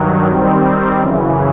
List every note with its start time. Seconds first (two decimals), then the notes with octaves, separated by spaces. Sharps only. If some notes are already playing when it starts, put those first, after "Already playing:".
Already playing: G2 D#3 F#3
0.28 D#3 G3 C4
1.00 F#2 C#3 E3